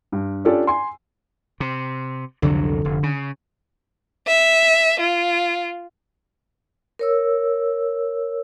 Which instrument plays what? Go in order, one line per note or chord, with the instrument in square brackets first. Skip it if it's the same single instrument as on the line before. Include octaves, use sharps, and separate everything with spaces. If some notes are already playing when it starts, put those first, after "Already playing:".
[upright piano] G2
C#4 D4 F4 G4 A4 D5
G#5 C6
[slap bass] C3
[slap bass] C2 F2 F#3 [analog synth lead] D3
[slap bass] F1
C#3
[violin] E5
F4
[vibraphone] A#4 C#5 E6